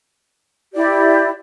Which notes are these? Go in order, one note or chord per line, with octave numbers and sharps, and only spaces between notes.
E4 G4 D5